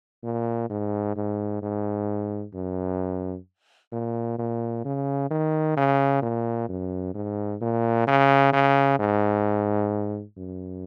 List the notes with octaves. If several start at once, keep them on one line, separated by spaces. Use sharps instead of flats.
A#2
G#2
G#2
G#2
F#2
A#2
A#2
C#3
D#3
C#3
A#2
F#2
G#2
A#2
C#3
C#3
G#2
F#2